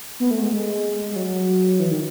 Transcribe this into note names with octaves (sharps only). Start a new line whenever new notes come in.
B3
A3
G#3
G#3
G#3
F#3
E3
D#3